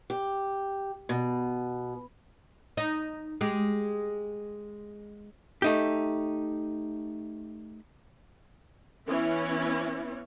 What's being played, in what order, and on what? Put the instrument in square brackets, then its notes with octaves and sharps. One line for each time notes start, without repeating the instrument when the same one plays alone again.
[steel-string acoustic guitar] G4
B2
[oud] D#4
G#3 G4
[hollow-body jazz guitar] A3 D#4 G4
[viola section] E3 B3 C#4 E4